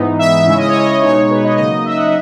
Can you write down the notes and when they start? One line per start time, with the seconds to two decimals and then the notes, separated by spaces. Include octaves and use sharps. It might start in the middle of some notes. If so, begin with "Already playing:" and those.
Already playing: G#2 E3 B3 D#4
0.19 E5
0.47 C#3 G#3 C#4 E4 E5
0.58 D#5
0.68 C#5
0.79 D#5
1.03 B2 G#3 D#4 C#5
1.31 B4
1.44 D#5
1.58 C#3 F#3 A#3 D#4 D#5
1.86 E5
1.96 F#5
2.06 E5